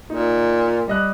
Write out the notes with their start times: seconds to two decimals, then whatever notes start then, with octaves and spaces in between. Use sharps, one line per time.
0.10 A#2 D#4
0.88 G3 D#5 F#6